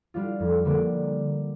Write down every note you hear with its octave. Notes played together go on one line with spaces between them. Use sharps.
G3 D4 F4
F2
D3 G3 A#3 D4